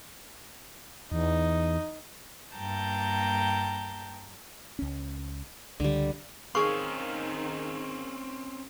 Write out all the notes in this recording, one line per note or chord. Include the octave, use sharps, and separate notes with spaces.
E2 D#4
G2 A#3 G5 A5 A#5 G6
C#2 C#4
C#2 D3 G3
D#3 C4 C#4 G#4 F5 C#6